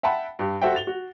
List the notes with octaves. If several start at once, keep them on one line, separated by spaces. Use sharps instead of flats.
E5 F#5 G5 A5 B5
G2 G4
F#4 A4 C5 E5 F#5 G5
A6 F7 G7
F#4